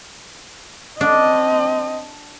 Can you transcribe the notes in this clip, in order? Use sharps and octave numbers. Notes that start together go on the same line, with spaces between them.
C4 D4 D#5